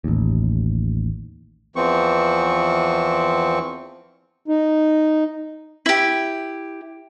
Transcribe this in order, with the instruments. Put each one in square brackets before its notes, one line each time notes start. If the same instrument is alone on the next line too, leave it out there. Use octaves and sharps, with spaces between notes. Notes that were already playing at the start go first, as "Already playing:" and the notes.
[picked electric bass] A1 D#2
[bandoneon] E2 E3 F3 C4 C#6
[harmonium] D#4
[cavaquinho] E4 G4